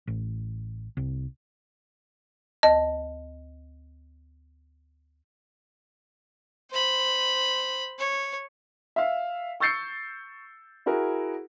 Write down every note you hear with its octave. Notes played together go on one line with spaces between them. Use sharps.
A1
C2
D2 D#5 A5
C5 B5
C#5
E5 F5
C#6 E6 G6 A6 C7 C#7
E4 F#4 G#4 A#4